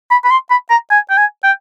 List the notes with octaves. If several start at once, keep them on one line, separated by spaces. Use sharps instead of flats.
B5
B5
C6
B5
A#5
G#5
G5
G#5
G5